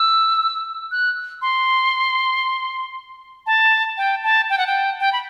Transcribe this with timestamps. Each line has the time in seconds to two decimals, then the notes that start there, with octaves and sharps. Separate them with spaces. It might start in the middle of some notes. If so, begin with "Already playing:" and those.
Already playing: E6
0.92 F#6
1.42 C6
3.46 A5
3.97 G5
4.24 A5
4.50 G5
4.58 F#5
4.67 G5
5.00 G5
5.13 B5